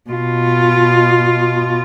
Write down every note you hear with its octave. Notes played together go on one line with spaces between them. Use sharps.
B2 F4